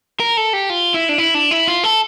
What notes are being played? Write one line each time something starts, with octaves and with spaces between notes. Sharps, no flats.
A#4
A4
G4
F4
E4
D4
E4
D4
E4
F4
A4